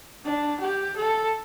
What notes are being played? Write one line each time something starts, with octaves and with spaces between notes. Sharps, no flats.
D4
G4
A4